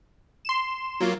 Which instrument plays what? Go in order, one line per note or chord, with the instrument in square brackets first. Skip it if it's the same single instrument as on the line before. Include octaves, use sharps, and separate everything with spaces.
[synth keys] C6 E7
[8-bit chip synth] F#3 A#3 F4